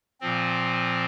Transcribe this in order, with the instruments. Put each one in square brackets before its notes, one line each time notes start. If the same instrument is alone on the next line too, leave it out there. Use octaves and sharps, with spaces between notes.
[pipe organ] A#2 F3 C4